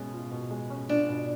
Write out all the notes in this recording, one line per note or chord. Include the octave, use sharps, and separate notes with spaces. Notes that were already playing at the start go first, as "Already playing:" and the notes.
Already playing: B2 G#3 C#4
F4
B2
G#3
C#4
D4 F4
B2